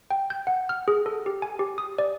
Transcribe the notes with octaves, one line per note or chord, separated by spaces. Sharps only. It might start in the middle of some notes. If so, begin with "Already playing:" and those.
G5
G6
F#5
F6
G#4
A4
G4
G#5
G4
D#6
D5